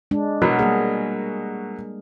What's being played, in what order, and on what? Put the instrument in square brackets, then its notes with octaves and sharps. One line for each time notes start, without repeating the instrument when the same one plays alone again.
[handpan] G#3 D4
[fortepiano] B2 F#3 [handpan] A#4
[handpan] G3 A#3 G#4